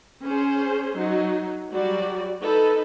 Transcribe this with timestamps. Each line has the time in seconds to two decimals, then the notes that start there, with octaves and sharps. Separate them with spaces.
0.25 C#4 G#4 C5
0.98 F#3 D#4
1.71 F#3 G3 F#4 D5
2.43 D#4 A4 B4